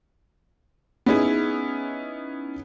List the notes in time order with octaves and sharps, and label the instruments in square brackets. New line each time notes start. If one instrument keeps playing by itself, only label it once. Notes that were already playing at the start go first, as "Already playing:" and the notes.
[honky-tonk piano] B3 C#4 D#4 E4 G#4